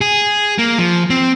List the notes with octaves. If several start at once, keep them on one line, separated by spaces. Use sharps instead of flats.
G#4
A#3
F3
C4